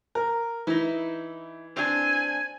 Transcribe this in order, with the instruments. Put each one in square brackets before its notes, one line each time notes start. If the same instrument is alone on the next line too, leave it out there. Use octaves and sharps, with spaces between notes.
[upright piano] A#4
[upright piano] E3 [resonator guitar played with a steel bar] D#4 E4
[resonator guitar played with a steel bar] C4 D4 [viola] G#5